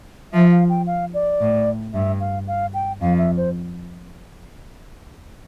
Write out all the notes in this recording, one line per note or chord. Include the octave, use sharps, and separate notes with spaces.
F3 E5
F5
G5
F5
D5
A2
G2 E5
F5
F5
G5
F2 F5
E5
C5